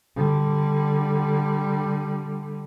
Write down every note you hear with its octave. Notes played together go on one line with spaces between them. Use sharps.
D3 G3